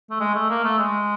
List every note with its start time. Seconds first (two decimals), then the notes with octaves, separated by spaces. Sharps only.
0.10 A3
0.20 G#3
0.35 A3
0.50 A#3
0.64 A3
0.79 G#3